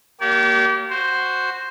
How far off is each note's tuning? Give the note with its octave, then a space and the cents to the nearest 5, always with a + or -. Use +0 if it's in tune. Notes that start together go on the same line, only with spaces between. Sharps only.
A#3 +0 G4 -30 D5 -45
F#4 +0 C5 +0